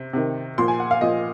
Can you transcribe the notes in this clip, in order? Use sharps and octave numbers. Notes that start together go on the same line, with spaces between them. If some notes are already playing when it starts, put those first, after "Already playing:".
Already playing: C3
C3 D#3
A#2 F3 C6
G#5
F#5
F5
A#2 F3 D#5